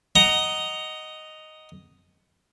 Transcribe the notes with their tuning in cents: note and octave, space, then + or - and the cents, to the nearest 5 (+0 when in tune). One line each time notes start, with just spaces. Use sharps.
D#5 +0 F#5 +15 A#5 +0